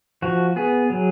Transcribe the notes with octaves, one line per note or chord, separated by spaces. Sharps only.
F3 F#4
B3 G#4
F#3